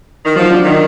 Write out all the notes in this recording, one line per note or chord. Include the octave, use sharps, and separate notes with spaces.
D#3
F3 F#3
D4
D#3